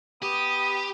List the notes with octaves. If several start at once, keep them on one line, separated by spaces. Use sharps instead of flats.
B3 G4 D#6